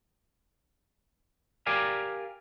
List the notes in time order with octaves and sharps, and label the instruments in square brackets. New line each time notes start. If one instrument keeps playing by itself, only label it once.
[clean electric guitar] G4 A#4 D5 F5 G#5